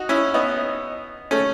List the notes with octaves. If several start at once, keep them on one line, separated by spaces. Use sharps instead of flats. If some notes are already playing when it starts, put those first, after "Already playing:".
Already playing: D#4 F#4
C#4 E4
B3 D#4
A3 C#4